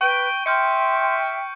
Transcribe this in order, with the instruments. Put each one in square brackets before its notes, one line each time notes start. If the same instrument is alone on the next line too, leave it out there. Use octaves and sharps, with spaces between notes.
[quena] B4 [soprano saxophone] G5 [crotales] C#6 D7
[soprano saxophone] E5 [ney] G5 [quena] C6 [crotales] F6 G6 C#7